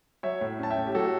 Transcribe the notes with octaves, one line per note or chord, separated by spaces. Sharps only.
F#3 C#5 E5
A2
C#4 A5
E5 G5
A2
G4
F#3 F#4 A4